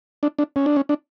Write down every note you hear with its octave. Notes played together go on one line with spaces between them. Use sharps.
D4
D4
C#4
D4
C#4
D4